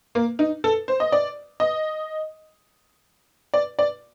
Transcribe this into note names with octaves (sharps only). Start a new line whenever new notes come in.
A#3
D#4
A4
C5
D#5
D5
D#5
D5
D5